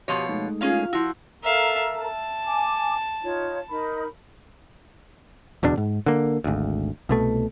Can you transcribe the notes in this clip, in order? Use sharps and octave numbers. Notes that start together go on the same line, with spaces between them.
B2 F3 G4 C#5
G#3 A3 D#4
A#3 C#4 F4 G#4 F5
F3 E4 F#4
A4 A#4 E5 F5 A#5
A5
G#5 D6
D#4 F4 C#5
D#4 A#4 B5
D1 E2 B2 D4
G#2
D3 A#3
G#1 D2
C2 B2 A3